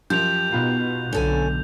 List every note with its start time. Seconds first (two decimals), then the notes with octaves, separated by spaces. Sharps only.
0.10 F#2 F3 G4 G6 F7
0.52 B2 B3 D#4 F4
1.13 B1 D3 C#4 A4 G#5